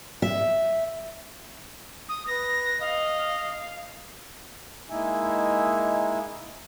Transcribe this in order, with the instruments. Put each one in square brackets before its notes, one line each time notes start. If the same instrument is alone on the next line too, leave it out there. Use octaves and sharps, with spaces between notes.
[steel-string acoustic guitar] E5
[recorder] D#6
[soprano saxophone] B4 [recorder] A#6
[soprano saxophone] D#5 [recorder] F5
[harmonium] G#3 A#3 D#4 E4 E5 G#5